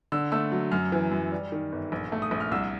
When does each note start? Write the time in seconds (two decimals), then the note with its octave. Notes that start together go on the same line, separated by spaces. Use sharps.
0.12 D3 E6
0.32 A3 E6
0.52 F#3
0.71 F#2 F6
0.92 E3
1.11 F#2
1.32 G3
1.52 D#3
1.72 G1
1.92 A#1
2.12 A3
2.22 D#6
2.31 A#1
2.40 F6
2.51 C2 E6